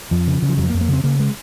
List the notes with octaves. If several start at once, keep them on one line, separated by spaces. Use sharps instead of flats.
F2 F3
C#3
C#3
F3
F2 F#3
A#3
F2
A#3
C#3 C4
C#3 A#3
G#3